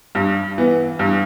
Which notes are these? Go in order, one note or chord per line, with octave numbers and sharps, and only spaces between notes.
G2
E3 B3
G2